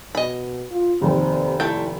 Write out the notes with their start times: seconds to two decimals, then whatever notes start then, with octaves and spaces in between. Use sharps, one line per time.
0.15 B2 D#5 B5
0.71 F4
1.02 F1 D#2 C4
1.60 A3 E4 G5